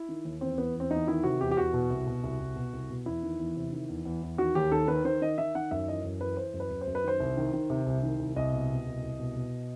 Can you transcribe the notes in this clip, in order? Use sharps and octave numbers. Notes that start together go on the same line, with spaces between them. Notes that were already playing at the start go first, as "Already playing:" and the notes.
Already playing: E4
D#3
D#2
E2 C4
E2 B3
E2
C4
E2 D#4
D#3 E4
C3 F#4
E2 G4
G4
E2 F#4
B2
C2
B2
C2
C2
B2
C2
B2
E2 E4
D#3
E2
C3
D#3
E2
E2
E2
D#3 F#4
D#2 G4
D#3 A4
D#3 B4
D#3 C5
D#3 D#5
D#3 E5
D#3 F#5
F#2 E5
E3 D#5
F#2
E3 B4
E3 C5
F#2
B4
F#2
C5
F#2
B4
D#3 C5
C2
D#3
D#3
C3
C2
D#3
C2
C2 D#5
B2
B2
C2
C2
B2
B2